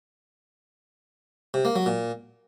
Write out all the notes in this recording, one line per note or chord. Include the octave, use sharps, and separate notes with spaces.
C3
A#3
F#3
A#2